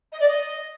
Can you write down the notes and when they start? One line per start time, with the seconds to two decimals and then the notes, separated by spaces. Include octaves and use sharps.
0.12 D#5
0.20 D5
0.28 D#5